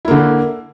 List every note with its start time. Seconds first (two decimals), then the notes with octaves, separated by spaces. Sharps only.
0.05 E4
0.08 A#3
0.11 D3